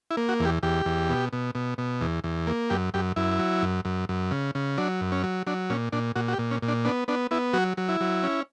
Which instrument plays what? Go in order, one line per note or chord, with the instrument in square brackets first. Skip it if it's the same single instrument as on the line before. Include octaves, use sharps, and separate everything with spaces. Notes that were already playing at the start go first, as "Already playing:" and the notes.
[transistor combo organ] E4
A#3
F#4
E2
G4
E2 G4
E2
B2
B2
B2
B2
E2
E2
A#3
F#2 G4
F#2 G4
F#2 E4
F#3
F#2
F#2
F#2
C#3
C#3
F#3 D4
F#2
C#4
F#3
F#3 D4
A#2 C#4
A#2 D4
A#2 F#4
F#4
G4
A#2
C#4
A#2
D4
B3 D4
B3 D4
B3 E4
F#3 F#4
F#3
E4
F#3
C#4